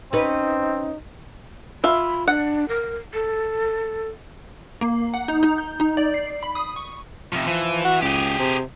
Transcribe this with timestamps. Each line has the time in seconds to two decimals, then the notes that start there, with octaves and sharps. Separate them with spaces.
0.13 C4 C#4 D#4 B4
1.84 F4 E5 B5
2.28 D4 F#5
2.69 A#4
3.14 A4
4.81 A#3
5.14 F#5
5.28 D#4
5.43 D#4
5.58 G6
5.80 D#4
5.97 D5
6.14 C7
6.43 B5
6.55 D#6
6.76 C#6
7.33 C3 F3
7.46 E3 F3
7.84 F#4
8.02 C#2 G4 G#4
8.39 C3